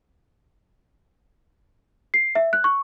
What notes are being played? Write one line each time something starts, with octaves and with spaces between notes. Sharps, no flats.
C7
E5
F#6
C#6